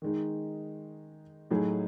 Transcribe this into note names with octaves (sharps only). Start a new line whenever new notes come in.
D#3 G#3 D#4
A2 F#3 A3 D#4 G#4